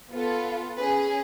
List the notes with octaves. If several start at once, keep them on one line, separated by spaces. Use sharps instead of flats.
B3 F4 A4
C#4 G#4 B4